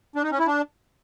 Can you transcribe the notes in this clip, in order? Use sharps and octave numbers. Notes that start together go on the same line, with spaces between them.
D4
D#4
C#4
E4
D4